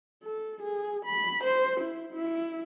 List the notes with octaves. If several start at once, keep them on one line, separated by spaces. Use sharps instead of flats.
A4
G#4
B5
C5
E4
E4